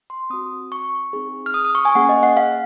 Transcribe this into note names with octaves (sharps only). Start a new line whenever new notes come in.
C6
C4 F#4 D#6
C#6
C4 D#4 G#4
F6
D#6
D#6
C#6
G#5
A#3 C#4 G#4 F#5
D#5
F#5
F5